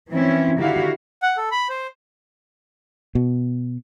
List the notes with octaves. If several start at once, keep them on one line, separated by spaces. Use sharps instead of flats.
E3 F3 C4 C#4 E4
D3 D#3 E4 F#4 G4 F5
F#5
A4
B5
C5
B2